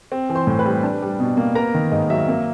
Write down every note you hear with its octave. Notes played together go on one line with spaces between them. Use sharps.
C4
E3
C5 C6
A2
B4 B5
G3
D4
G3
B2
A#3
B3 A#4 A#5
D#3
G#2 D#5
F#3 E5
A#3